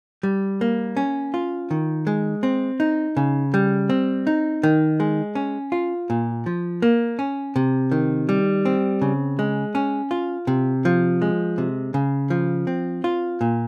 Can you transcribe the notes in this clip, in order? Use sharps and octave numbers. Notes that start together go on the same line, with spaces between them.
G3
A#3
C#4
F4
D#3
G#3
C4
D#4
C#3
G3
C4
D#4
D#3
G#3
C#4
F4
A#2
F3
A#3
C#4
C3
D#3
G3
C4
C#3
G#3
C#4
F4
C3
F3
G#3
C3
C#3
F3
C4
F4
A#2